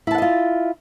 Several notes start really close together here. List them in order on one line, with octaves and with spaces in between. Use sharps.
E4 A5 F#5 D#5 F4